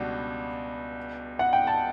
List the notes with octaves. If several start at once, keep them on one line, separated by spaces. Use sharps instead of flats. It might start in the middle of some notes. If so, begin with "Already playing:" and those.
Already playing: C#2 B2 G3 D4 F#4
F#5
G5
A5